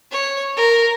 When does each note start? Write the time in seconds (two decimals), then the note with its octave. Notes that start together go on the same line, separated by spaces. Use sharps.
0.11 C#5
0.56 A#4